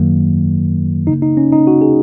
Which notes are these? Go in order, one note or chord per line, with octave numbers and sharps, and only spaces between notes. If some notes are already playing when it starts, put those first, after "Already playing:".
Already playing: F#2 D#3 F#3 A#3
C#3 A#3 D#4
D#4
C#4
D#4
F#4
G#4